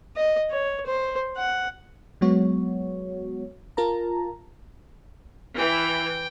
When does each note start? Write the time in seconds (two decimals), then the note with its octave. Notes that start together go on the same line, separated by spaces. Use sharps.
0.16 D#5
0.50 C#5
0.86 C5
1.36 F#5
2.21 F#3 G#3 B3 F#4 C#5
3.77 F4 A#4 A5 A#5
5.57 E3 G5